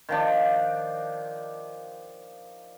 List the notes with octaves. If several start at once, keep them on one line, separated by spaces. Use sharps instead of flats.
D#3 F3 D4